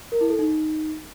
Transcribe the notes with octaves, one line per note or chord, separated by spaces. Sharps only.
A#4
E4
A4
D#4